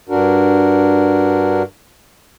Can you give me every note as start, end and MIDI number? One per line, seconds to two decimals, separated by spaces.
0.09 1.62 43
0.09 1.62 62
0.09 1.62 66
0.09 1.62 70